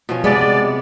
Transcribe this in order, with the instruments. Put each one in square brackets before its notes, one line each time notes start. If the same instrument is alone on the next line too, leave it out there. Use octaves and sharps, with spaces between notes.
[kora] B2 F3 C#4
[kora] C3 F#3 B3 [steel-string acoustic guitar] G#3 [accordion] D5